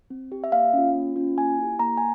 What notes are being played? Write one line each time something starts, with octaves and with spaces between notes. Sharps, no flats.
C4
G4
E5
A#3 F5
C#4 F4
A#3
C#4 F4
A#3 G#5
E4 G4
A#3 A#5
G#5